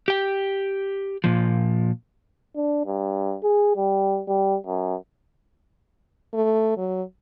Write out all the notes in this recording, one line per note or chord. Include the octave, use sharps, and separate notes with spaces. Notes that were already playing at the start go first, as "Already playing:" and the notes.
G4 G5
A#2 F3
D4
G2
G#4
G3
G3
F#2
A3
F#3